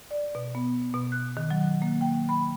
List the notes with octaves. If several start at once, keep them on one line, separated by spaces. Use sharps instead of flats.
D5
B2
B3
B2
F#6
D#3
F#3
A#3
G5
B5